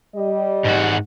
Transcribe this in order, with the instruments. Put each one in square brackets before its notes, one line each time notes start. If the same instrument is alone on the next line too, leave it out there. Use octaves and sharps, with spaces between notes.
[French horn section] G3 D#5
[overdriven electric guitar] G#2 F#4